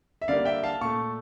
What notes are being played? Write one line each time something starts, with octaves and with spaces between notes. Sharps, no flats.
E5
D3 G3 A#3 D5 F5
E5 G5
F5 A5
A#2 A3 A5 C#6